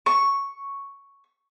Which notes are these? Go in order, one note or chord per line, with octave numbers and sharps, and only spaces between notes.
C#6